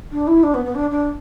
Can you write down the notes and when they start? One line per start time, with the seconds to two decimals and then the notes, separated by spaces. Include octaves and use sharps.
0.12 D4
0.27 E4
0.43 D4
0.54 B3
0.65 B3
0.75 D4
0.91 D4